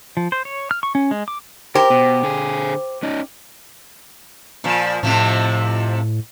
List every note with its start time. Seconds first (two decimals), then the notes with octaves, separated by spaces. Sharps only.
0.17 F3
0.32 C5
0.45 C#5
0.71 F6
0.83 C#6
0.95 C#4
1.11 G#3
1.28 D6
1.75 G4 A#4 C5
1.90 B2
2.23 D3 G#4
3.03 C#4 D#4
4.64 A#2 F3
5.03 F2 A2 C3 F3